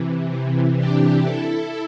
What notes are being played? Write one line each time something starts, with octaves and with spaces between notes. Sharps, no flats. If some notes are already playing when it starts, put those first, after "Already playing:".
Already playing: C3 E3
C3 E3
D4 G4
E4 A4